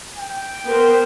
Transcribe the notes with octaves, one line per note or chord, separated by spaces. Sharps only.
G5
B3 A#4 C5